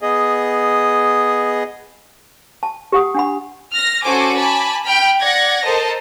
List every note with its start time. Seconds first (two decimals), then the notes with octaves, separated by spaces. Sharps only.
0.02 B3 G#4 D#5
2.63 A5
2.92 G4 F#5 D#6
3.15 D4 F#5 B5
3.73 F6 A#6
4.04 C#4 F#4 A4 C5 G#5 D6
4.36 G#5 A5 B5 D6
4.84 G5 B5 F6
5.21 D5 F#5 G#6 A#6
5.64 A4 A#4 C5 D#5 A5